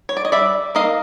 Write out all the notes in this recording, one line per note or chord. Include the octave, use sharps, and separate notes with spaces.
C#5
D5
D#5
G3 D5 E5
A#3 D#4 D#5 F5